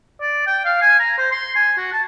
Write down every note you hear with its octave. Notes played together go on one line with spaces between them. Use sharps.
D5
G5
F5
G#5
A#5
C5
C6
G#5
F#4
A5